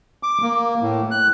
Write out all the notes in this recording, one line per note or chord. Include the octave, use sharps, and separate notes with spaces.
D6
A#3
A2
F#6